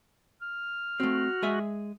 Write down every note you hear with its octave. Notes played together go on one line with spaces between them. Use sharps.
F6
A3 C4 F#4
G#3 G#4 E5